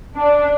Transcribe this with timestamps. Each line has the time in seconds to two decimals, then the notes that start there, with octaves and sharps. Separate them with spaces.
0.17 D4